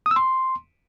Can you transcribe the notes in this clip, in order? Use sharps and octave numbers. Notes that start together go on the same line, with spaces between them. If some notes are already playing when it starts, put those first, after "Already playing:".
D#6
E6
C6